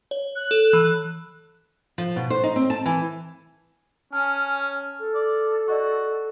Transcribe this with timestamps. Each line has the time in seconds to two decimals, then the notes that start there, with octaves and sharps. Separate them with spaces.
0.11 C#5
0.36 F#6
0.51 A4
0.73 E3
1.98 F3
2.16 B2
2.30 C5
2.43 D#4
2.56 C4
2.70 A5
2.86 E3
4.13 C#4 G#5 A5 F6
4.99 A4
5.14 D5
5.68 F#4 D5 D#5 C#6